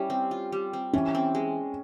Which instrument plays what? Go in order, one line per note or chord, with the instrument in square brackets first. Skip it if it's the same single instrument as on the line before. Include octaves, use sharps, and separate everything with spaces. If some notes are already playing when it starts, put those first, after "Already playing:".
Already playing: [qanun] G3 C#4 E4
C4
F4
G3
C4
[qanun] E3 [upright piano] C#4
[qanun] C4
G#3